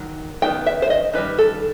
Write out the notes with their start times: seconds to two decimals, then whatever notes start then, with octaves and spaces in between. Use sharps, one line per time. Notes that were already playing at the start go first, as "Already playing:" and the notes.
Already playing: D#3 F#3
0.42 D#3 F#3 B3 D#4 G5
0.66 E5
0.82 C5
0.90 D#5
1.14 D#3 G3 D#4 B4
1.38 A4